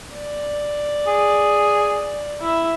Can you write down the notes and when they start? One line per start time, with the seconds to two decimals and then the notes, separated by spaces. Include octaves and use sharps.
0.13 D5
1.07 G#4
2.41 E4 E5